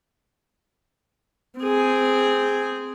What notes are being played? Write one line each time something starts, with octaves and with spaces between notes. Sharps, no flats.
C4 G#4